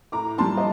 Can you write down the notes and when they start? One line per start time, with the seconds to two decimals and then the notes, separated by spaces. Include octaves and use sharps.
0.12 A2 A#5 D6
0.38 G3 D4 A5 C6
0.57 D#5